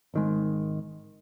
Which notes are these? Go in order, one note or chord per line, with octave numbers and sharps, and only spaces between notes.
G#1 D#3 G#3